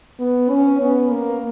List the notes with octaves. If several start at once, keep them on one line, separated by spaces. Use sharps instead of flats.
B3
C#4
B3
A#3